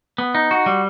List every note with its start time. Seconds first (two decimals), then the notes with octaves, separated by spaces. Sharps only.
0.18 B3
0.35 D#4
0.51 F#4
0.66 G3